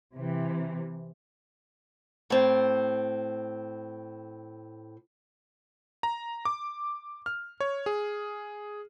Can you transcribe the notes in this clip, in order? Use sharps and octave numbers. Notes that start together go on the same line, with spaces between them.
C3 E3
A2 C4
A#5
D6
F6
C#5
G#4